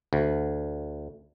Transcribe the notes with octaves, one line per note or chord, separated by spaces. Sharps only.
D2